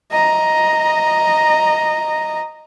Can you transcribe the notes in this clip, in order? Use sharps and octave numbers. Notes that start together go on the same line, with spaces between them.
D#5 A#5